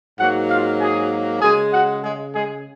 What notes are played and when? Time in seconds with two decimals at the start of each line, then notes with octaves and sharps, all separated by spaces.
0.18 G#2 F#3 A#3 F#4 F#5
0.49 F4 F5
0.80 G#4 G#5
1.41 C#3 G#3 G#4 G#5
1.72 F#4 F#5
2.03 G#3 G#4
2.33 G#3 G#4